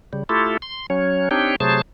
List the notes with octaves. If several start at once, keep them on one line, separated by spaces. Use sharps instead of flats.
C#3 G3
A3 E4 F4 G4 A4
C6
F#3 C#4 C#5
C4 D4 D#4 G4 C#5 G5
C3 F#3 A3 G#4 C5 A5